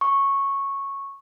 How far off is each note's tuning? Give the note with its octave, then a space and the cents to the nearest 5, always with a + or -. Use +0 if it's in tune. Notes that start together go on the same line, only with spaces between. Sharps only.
C#6 -10